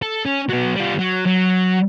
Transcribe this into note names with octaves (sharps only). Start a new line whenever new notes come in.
A4
C#4
F#3 B3
G3 F4
F#3
F#3